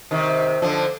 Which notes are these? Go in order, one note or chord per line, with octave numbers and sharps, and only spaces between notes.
C3 D#3
D3 F3